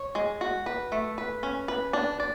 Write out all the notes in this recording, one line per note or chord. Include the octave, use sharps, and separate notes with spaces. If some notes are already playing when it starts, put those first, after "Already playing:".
Already playing: C#5
G#3
F#4
B4
A3
B4
C#4
B4
D4
D5